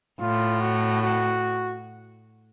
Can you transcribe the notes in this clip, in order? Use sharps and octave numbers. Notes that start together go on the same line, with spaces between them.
A2 F4
F#4
F#4